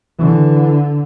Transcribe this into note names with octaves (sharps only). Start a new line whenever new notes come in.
D3 E3